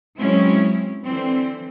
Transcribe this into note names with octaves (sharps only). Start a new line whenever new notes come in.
F#3 G#3 C4 C#4 E4
D3 E3 C4